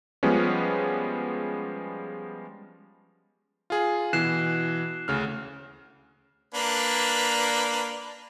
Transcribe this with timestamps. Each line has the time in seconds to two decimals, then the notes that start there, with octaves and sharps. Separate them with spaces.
0.23 F3 G3 G#3 B3 C#4
3.70 F4 G#4
4.13 B2 E3 F#6 C7 E7
5.08 D2 C#3 F6
6.55 A#3 D4 B4